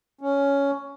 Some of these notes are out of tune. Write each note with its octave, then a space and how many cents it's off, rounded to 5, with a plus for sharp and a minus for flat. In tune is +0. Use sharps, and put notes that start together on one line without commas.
C#4 +10